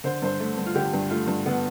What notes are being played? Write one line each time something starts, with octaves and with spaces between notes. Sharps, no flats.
D3 C5
G2 C5
A3
G2
F4
D3 G4
G2
A3 F4
G2
D3 B3